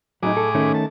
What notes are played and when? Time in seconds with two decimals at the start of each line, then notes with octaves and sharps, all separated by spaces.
0.23 A2 F#3 D4 D#4 G#4 D6
0.37 A4
0.55 D#3 A3 C#4
0.74 A5